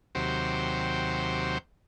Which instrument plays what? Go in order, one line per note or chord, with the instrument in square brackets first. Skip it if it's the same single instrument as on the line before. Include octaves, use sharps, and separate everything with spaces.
[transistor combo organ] D#2 C3 F#3 G4 C5